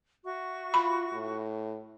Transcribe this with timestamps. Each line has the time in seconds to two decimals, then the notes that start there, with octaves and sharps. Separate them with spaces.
0.25 F#4 E5 C#6
0.74 F4 B5
1.12 A2